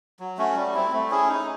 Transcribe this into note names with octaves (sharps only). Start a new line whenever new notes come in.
F#3
A3 C#4 F#4
G3
C4 E4
A3
C#4 E4 G#4
D#4